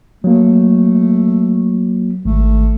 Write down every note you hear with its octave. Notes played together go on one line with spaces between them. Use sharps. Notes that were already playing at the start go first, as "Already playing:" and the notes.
F#3 A3 A#3
G#1 A3